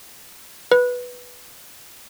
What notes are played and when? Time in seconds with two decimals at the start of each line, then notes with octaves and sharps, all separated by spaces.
0.72 B4